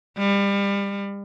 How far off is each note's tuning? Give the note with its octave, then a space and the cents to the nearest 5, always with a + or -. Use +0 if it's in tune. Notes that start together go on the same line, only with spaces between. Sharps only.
G3 +30